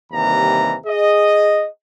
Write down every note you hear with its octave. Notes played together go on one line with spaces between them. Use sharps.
D#2 C3 E3 G3 A#5
G#4 D#5